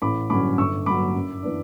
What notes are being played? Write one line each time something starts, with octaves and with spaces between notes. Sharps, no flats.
A1 B5 D6
G2 D3 F#3 C#4 B5 D6
G1 C#6 E6
G2 F#3 B5 D6
F#2
E3 B3 D4